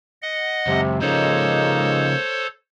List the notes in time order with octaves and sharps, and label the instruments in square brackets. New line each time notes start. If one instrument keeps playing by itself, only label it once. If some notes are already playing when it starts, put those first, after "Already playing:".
[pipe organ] D#5 F#5
[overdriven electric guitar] C#2 F#2 [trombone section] C3
[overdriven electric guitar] C#3 F3 [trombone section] G#3 A#3 D#4 [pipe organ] A4 C5 C#5